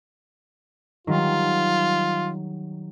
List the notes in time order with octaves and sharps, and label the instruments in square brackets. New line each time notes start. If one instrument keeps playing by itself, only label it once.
[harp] D#3 F#3 G3 [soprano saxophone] F4